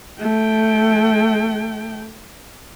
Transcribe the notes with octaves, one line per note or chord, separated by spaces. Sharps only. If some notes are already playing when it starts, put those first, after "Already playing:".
A3 G5